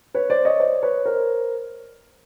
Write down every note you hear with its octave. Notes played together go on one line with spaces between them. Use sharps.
B4 C#5
C5 D5
C#5 D#5
C5 D5
B4 C#5
A#4 C5